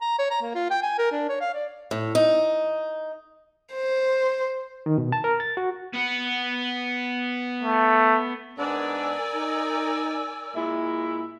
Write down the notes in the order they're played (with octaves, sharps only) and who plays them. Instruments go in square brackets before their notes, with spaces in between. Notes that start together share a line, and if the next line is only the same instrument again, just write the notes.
[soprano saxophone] A#5
C#5
A#5
A#3
F4
G5
G#5
A#4
D4
C#5
F5
D5
[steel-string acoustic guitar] A2
D#4
[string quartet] C5
[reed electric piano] D#3
B2
A5
A#4
A6
F#4
[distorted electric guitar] B3 F#5
[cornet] A3
[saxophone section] G#2 B3 D4 [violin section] A#4 D5 G#5 [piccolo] E6
[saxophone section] D#4
A#2 G#3 E4